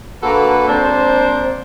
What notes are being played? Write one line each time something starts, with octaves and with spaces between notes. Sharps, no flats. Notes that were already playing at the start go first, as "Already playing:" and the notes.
D3 A#3 F#4 A4 B4
G#3 A#3 C4 D4 C5